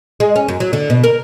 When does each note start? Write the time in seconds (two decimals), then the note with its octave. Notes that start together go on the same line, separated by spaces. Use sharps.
0.20 G#3
0.36 C#4
0.48 F#2
0.60 F#3
0.73 D3
0.90 B2
1.04 A#4